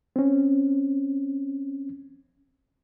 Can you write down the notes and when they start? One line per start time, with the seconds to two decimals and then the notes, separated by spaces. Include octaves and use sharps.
0.16 C4 C#4